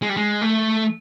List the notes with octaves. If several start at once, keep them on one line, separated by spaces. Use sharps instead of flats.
G#3
G3
G#3
A3